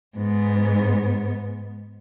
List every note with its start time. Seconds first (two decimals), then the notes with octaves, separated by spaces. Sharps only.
0.16 G#2 B3